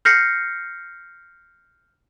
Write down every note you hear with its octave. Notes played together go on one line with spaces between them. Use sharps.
F6 G6 A#6 C7 C#7